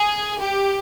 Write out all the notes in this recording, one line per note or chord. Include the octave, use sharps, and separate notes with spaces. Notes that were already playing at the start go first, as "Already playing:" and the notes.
Already playing: G#4
G4